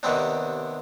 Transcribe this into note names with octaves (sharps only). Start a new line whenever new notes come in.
D#2 C3 D#3 B3 C4 D4